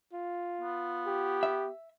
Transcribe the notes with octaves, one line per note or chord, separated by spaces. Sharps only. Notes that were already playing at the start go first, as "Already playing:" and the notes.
F4
B3
G4
E5